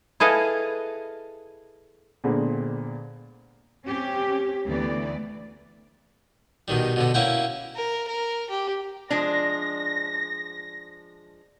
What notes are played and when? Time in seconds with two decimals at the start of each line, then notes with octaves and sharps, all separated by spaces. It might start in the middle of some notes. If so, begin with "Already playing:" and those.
0.20 E4 G#4 A4 B4 D#5 F5
2.24 A#2 D3 G#3 B3 C4
3.84 C4 C#4 G4
4.66 D2 E3 A3 B3 D5
6.68 B2 D#3 G3
6.96 B2 D3 B3
7.14 A#3 C#4 E4 F#5 G5
7.76 A#4
8.08 A#4
8.50 G4
9.10 F3 G#3 D4 A#6